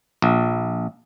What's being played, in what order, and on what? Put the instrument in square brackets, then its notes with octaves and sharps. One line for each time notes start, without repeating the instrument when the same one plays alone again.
[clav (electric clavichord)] A#1